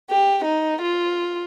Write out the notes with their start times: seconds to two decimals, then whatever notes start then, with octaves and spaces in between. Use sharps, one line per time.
0.10 G4
0.45 D#4
0.83 F4